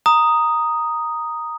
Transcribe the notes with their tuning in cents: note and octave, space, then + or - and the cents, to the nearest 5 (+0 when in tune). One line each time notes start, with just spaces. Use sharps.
A#5 +0 D#6 +0